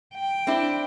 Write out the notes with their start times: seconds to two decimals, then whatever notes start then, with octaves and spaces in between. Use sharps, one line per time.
0.14 G5
0.47 C4 D4 E4